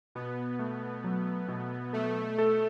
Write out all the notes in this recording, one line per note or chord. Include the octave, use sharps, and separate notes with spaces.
B2 B3
A3
F#3
B2
A3 A4
A4